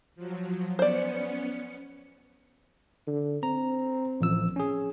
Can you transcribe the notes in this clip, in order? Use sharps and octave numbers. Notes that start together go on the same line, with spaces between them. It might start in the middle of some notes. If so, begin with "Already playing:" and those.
F3 F#3
B3 C#4 C5 D5 C#7
D3
C4 A#5
A1 F3 E6
C#4 G#4